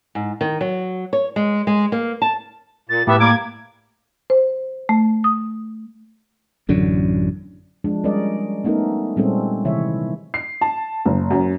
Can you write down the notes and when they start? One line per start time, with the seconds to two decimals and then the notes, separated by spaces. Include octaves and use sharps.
0.15 G#2
0.41 D#3
0.61 F#3
1.13 C#5
1.36 G#3
1.67 G#3
1.92 A#3
2.22 A5
2.89 A#2 A6
3.07 A2 B3 G4 E5
3.20 G3 A#3 D6 G#6
4.30 C5
4.89 A3
5.24 D#6
6.69 A1 F#2 D3
7.84 F3 G#3 D4
8.04 G3 G#3 C#4 A#4 D5 D#5
8.64 A3 B3 C#4 D#4 A4 A#4
9.16 A#2 G3 G#3 C4 C#4 A4
9.65 C3 D#3 E3 E4 C#5 E5
10.34 C7
10.61 A5
11.06 F#1
11.31 F#2